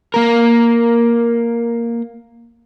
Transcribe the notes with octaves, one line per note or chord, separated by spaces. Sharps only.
A#3 A#4